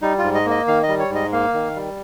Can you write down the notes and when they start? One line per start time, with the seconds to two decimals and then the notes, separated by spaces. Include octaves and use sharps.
0.02 G3 D#4
0.18 F4
0.24 G#2
0.35 D#5
0.46 A#3 D#5
0.67 D#3 F5
0.83 D#5
0.88 G3
0.99 C#5
1.10 G#2
1.15 D#5
1.32 A#3 F5
1.54 D#3
1.75 G3